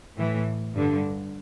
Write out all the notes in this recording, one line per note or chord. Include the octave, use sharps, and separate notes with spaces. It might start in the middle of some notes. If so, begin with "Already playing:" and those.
A2 E3
G2 D3